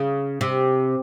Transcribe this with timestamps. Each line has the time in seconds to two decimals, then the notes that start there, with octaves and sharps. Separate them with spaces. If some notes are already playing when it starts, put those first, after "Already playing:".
Already playing: C#3
0.41 C3